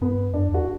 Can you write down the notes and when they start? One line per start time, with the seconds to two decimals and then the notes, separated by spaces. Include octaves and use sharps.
0.01 G2 B3
0.33 F#2 D4
0.49 E2
0.54 F#4